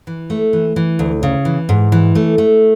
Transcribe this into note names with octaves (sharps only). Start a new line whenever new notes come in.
E3
A3
E3
E3
D2
C#3
E3
G#2
E3
A3
A3